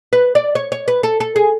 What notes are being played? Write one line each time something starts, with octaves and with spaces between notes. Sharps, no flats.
B4
D5
C#5
C#5
B4
A4
A4
G#4